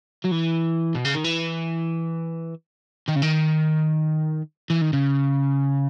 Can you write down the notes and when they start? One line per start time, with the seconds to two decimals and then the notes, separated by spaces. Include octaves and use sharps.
0.25 F#3
0.32 E3
0.95 B2
1.05 C#3
1.14 D#3
1.24 E3
3.09 D#3
3.16 C#3
3.23 D#3
4.70 E3
4.81 D#3
4.93 C#3